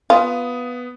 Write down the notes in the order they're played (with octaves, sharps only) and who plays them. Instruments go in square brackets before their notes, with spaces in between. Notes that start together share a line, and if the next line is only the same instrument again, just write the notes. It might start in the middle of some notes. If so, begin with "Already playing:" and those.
[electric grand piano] B3 D#6 [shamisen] F4